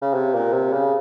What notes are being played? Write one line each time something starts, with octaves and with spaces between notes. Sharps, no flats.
C#3
C3
A#2
C3
C#3